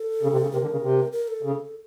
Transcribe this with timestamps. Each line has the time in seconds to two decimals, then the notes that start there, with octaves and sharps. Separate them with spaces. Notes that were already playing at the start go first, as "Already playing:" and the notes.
Already playing: A4
0.23 C#3
0.32 C3
0.42 C#3
0.52 C3 A#4
0.62 D3
0.72 C#3
0.82 C3
1.12 A#4
1.28 A4
1.43 C#3